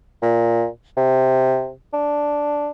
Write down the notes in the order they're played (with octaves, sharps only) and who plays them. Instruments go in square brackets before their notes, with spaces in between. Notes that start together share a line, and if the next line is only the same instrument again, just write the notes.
[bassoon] A#2
C3
D4